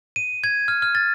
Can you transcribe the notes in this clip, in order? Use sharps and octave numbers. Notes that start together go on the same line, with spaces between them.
D#7
G#6
F6
F6
A6